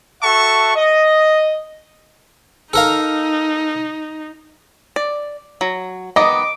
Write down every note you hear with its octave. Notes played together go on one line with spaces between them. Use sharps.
F#4 A4 E5 F#5 A5 C#6
D#5
D#4 A4 A#4 F5
D5
F#3
D#3 B3 D#5 D6